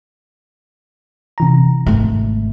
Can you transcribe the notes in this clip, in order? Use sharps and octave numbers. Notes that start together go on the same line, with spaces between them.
C3 E3 A#5
G#1 A3